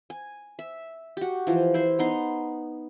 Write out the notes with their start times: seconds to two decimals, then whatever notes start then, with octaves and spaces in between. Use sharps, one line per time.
0.10 G#5
0.59 E5
1.17 F#4 G4
1.47 E3 F3
1.74 E4 C5
1.99 B3 D#4 C6